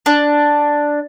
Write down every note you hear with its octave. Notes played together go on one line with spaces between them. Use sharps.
D4